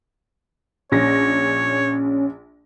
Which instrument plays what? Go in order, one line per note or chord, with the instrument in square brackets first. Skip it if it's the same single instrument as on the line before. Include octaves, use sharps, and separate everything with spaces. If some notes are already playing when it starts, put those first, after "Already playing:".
[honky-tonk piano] A#1 A#6 [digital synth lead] C#4 [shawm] C#5